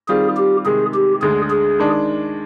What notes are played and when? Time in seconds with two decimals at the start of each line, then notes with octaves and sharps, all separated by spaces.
0.09 D#3 G3 C4 F4 G#4
0.37 G4
0.65 C3 D#3 G#3 G#4
0.94 G4
1.22 D2 D3 G#3 G#4
1.50 G#4
1.79 D#3 G#3 D4